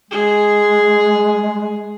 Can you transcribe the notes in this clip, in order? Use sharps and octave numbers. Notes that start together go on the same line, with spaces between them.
G#3 G#4